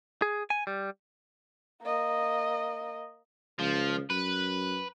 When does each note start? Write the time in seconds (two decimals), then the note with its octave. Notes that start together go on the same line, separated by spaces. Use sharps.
0.22 G#4
0.50 G#5
0.67 G3
1.83 A#3 D#5
3.59 C#2 F3
4.10 F#2 B4